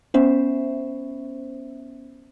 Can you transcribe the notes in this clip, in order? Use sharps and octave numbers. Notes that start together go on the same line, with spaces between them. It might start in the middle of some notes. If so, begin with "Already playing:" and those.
B3 C#4 C5 E5